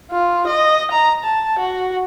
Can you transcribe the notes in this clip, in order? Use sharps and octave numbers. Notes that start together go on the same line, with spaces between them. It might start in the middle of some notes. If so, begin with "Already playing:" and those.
F4
D#5
A#5
A5
F#4